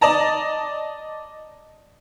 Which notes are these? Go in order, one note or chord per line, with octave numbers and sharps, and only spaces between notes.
D5 D#5 A5 A#5